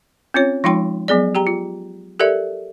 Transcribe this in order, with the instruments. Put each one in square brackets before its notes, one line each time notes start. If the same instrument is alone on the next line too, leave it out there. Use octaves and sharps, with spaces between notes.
[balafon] C4 C#4 F4 C#5
F3 G#3 D#4 F4 G5 C6
F#3 B3 G#4 D5
G4 G5 A#5
F4
G4 A4 A#4 D5 E5